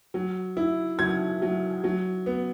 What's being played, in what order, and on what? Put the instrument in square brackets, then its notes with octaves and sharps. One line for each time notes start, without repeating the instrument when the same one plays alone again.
[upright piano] F#3
E4
F#3 G#6
F#3
F#3
B3